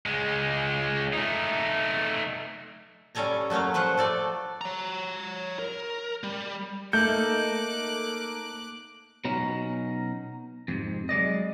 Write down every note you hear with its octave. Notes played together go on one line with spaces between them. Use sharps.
C#2 G#3
A3 D#4
G3 C#4 A4 G#5 A#5
F#3 A3 A#3 C#4 F5
F3 B4 C5 F#5
A3 A4 D5
C#5 A#5
A#4
G3
A3 A#3 D#4 A4 D6 F#6 G6
B2 F#3 C#4 D#4
F2 G#2 C3
F#3 G#3 D5 D#5